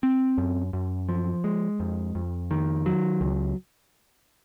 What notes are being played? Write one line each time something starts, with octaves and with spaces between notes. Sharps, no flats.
C4
F#2
F#2
F3
G#3
F2
F2
D#3
F#3
C#2